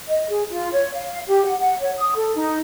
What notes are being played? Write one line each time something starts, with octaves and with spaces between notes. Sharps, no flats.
D#5
G#4
F4
C#5
F5
G4
F#5
F#5
C#5
D#6
A4
D#4